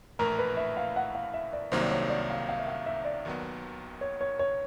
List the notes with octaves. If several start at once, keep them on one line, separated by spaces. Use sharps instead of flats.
A#1 A2 E3 A3 A#4
B4
E5
F5
F#5
F5
E5
D5
C2 C3 D#3 F#3 A#3 C5
D5
C#5
D5
F5
F5
E5
F5
E5
D5
D#2 D#3 F#3 B3
C#5
C#5
C#5